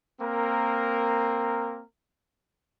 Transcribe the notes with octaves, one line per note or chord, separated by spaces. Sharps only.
A#3 C4 A#4